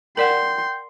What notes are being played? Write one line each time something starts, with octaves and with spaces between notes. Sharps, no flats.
A#4 D5 F#5 G5 C6